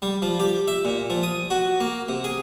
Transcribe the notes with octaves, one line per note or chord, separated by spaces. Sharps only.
G3
F3
G4
E5
A#2
F3
D#6
F#4
A#3
C3
G#4